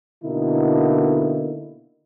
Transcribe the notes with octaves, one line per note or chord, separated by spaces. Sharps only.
B2 D3 A#3 D#4 E4